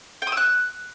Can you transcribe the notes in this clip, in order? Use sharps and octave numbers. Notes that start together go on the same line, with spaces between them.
G5
D#6
E6
F#6